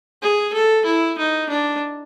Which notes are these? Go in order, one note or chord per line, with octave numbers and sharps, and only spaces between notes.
G#4
A4
E4
D#4
D4